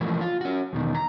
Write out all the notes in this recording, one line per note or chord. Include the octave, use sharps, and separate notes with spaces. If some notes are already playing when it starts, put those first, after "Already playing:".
E3 F3 A3 A#3
F4
C#4 F#4
E2 B2 D#3
A#5